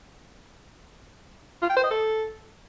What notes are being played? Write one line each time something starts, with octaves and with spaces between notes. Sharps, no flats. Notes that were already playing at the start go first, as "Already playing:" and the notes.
F4
G5
C5
D#5
A4